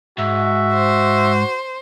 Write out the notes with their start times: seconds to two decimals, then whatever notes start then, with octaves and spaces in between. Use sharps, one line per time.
0.18 G#2 F#4 E5
0.74 C5